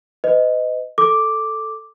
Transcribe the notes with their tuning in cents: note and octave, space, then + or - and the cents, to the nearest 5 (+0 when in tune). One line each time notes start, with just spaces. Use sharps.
B4 +45 D#5 +0
A4 +0 D6 +0